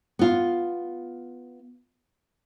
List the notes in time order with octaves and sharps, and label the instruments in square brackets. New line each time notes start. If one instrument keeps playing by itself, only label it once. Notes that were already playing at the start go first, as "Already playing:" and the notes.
[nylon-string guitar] B3 F4